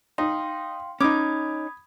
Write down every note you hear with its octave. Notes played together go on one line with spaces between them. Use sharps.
D#4 F5 G5 C6
C#4 D#4 B5 D6 D#6 G#6